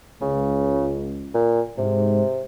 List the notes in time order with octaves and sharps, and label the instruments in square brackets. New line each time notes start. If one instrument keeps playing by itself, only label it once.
[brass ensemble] C#2 [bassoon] C#3
[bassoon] A#2
[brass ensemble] G#2 [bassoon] C3